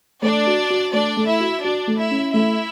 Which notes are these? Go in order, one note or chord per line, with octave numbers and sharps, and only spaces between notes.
A3 D4 D5
F#4
F#4
A3 D4 D5
A3
E4 E5
F#4
D4 F#4 D5
A3
E4 E5
C#4
A3 E4 E5